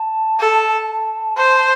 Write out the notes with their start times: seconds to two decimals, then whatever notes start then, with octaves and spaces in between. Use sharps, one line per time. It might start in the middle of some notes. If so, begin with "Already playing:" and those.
Already playing: A5
0.40 A4
1.37 C5